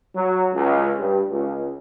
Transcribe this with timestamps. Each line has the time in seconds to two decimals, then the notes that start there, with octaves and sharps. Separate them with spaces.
0.15 F#3
0.53 C#2
0.98 G2
1.29 C#2